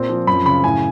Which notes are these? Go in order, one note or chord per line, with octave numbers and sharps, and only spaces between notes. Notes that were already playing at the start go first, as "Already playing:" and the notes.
Already playing: A#2 C4
F3
F#2 B5
C#3 B5
A2 G#5